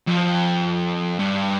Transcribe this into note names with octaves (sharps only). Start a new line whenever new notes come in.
F2
G2